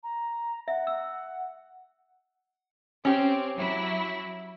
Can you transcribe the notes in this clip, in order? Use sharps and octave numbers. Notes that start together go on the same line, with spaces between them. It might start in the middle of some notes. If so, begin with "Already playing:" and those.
A#5
E5 F#5
E6
C4 C#4 G4
F#3 E4